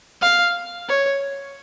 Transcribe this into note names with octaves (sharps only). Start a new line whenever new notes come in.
F5
C#5